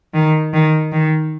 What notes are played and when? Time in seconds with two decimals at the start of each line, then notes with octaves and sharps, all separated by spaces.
0.14 D#3
0.53 D#3
0.92 D#3